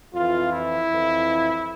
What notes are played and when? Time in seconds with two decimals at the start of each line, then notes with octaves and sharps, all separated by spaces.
0.14 F2 E3 F4
0.53 E4
0.91 F2 E3